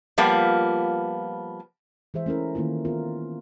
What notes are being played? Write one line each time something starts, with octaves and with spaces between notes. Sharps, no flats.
F3 G3 A#3 B3 F4
E3 G#3 G#4 C5 E5
A3 C#4 E4 A#4
D#3 A3 A#3 E4 F4
B3 F4 A#4